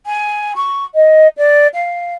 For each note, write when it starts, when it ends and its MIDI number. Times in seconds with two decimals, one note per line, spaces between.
0.06 0.52 80
0.56 0.84 85
0.94 1.27 75
1.37 1.67 74
1.74 2.14 77